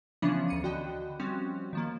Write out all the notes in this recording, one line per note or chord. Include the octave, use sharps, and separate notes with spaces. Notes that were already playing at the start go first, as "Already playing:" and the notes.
C#3 E3 F3 B3 C#4 D4
D2 C#7 D#7
D3 F#4 D#5 G5 B5
F3 G3 C4 C#4 F#4
D#3 F3 A#3